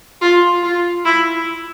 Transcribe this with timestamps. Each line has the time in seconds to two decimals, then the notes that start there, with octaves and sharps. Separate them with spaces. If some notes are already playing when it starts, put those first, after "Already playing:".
0.21 F4
0.63 F4
1.05 E4